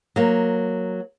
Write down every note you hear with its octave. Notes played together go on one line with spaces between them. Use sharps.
F#3 A#3